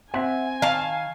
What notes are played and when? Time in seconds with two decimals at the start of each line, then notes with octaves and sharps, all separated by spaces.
0.14 C4 E5 F#5 G#5
0.62 D#3 F5 A5